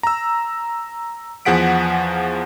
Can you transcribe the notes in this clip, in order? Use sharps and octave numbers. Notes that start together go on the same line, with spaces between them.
A#5 E6
E2 F3 G#4 F#5 B6 D7